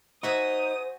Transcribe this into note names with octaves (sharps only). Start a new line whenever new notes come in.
D#4 F#4 C5 E5 G#5 D#6